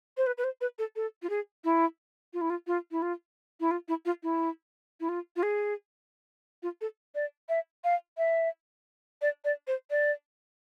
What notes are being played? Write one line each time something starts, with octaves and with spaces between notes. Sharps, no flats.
C5
B4
B4
C5
B4
A4
A4
F4
G#4
E4
F4
E4
F4
F4
E4
F4
E4
F4
E4
F4
E4
E4
F4
F4
G#4
F4
A4
D5
E5
F5
E5
D5
D5
C5
D5